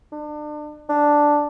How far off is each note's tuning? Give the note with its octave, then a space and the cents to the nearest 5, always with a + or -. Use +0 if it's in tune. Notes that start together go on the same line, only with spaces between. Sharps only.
D4 +35
D4 +0